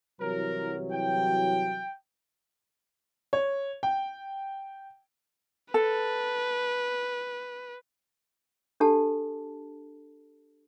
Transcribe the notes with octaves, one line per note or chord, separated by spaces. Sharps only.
C2 E3 F#3 A#4
G5
C#5
G5
A4 B4
D4 G4 A4 A5